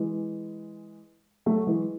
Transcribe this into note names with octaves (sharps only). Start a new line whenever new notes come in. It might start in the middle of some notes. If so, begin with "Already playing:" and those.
Already playing: E3 G#3
F#3 A3
E3 G#3